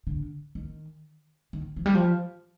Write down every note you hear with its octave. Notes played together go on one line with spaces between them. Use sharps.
D3
D#3
D#3
F3
G3
F3